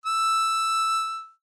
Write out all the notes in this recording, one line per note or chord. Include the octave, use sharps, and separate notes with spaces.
E6